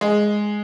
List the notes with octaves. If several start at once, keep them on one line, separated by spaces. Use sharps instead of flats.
G#3